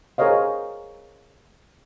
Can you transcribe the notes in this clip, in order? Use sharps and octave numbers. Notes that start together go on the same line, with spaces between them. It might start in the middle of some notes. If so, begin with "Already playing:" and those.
G#4 A#4 C5 C#5 D#5 F5